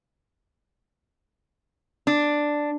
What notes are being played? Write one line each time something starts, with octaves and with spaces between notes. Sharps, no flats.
D4